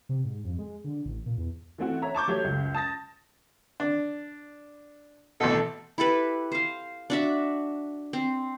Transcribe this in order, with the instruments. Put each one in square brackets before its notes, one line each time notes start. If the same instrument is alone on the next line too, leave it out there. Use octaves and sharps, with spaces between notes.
[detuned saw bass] C3
G#2
F2
G#3
D3
A1
A#2
E2
[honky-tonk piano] E3 A3 C4 F#4
C#5 E5 A#5
A5 C#6 D6 G6
F#3 A3 G4 C#5
C#2 F#2
A5 D#6 A6 A#6
[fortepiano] D4
[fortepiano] A1 B2 [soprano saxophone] A4
[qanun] E4 G4 A4 B4
C5 F5
D4 F#4 E5
C4